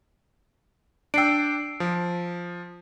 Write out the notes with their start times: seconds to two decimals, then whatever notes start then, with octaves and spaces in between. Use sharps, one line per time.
1.14 D4 G5 E6 C7 D7
1.80 F3